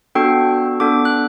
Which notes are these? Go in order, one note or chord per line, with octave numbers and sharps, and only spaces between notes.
B3 D4 F#4 A4 G5
B3 D4 A4 D6
F#6